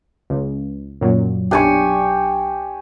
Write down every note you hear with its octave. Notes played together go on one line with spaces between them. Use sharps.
C#2
F#2 A#2 F#3
B1 D4 G4 G#5 C#6